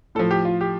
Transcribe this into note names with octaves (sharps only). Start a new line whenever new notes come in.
A2 F3 A4
G4
F4
G4